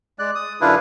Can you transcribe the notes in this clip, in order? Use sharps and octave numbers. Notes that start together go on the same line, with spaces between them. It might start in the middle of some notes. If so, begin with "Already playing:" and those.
G#3 D5 F#6
D#6
F#2 D3 D4 E4 F4 B4